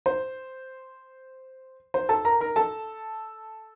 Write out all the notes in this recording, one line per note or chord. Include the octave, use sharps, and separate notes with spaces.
C5
C5
A4 A5
A#4 A#5
A#4 A#5
A4 A5